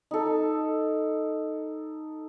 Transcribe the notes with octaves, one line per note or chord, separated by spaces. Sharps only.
D#4 A4